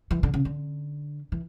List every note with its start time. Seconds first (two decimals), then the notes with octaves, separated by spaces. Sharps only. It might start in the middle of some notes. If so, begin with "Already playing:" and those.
0.11 E3
0.23 D3
0.34 C#3
0.45 D3
1.32 E3